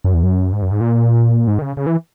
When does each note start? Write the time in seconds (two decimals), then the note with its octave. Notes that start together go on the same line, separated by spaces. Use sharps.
0.04 F#2
0.14 E2
0.23 F#2
0.53 G#2
0.62 F#2
0.71 G#2
0.81 A#2
1.47 G#2
1.59 D#3
1.62 C#3
1.77 C#3
1.86 E3